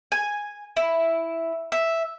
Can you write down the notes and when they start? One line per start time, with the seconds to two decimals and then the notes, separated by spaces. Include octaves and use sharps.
0.12 G#5
0.77 E4
1.72 E5